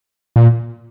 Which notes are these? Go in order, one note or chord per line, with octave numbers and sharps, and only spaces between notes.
A#2